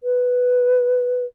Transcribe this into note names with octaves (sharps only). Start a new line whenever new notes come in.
B4